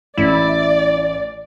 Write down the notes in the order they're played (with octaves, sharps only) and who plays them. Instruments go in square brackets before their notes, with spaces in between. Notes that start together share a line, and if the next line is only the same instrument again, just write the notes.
[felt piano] A1 [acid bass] E4 [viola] D5